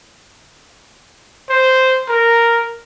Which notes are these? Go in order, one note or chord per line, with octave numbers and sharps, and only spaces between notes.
C5
A#4